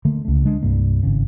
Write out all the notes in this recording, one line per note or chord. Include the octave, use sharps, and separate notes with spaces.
D3 A3 A#3
C#2 A3
D3 G#3 D4
C2 G2 G3 A#3
G#1 C#3